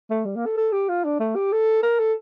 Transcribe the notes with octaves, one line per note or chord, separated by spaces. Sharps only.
A3
G3
A#3
A4
A4
G4
F4
D4
A3
G4
A4
A#4
A4